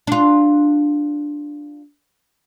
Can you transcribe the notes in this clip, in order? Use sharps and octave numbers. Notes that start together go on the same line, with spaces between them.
D4 F4